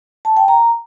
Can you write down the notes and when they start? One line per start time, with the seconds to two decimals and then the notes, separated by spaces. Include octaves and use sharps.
0.25 A5
0.37 G5
0.48 A#5